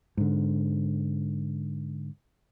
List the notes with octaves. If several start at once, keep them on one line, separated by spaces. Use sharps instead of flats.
G#2 D3